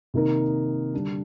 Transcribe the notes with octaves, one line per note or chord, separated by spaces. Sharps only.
C3 D#3 A#3 D#4 A#4
D3 G3 D4